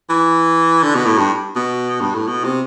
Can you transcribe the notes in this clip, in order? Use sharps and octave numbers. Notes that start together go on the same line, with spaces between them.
E3
D3
B2
A2
G2
B2
G2
A2
B2
C3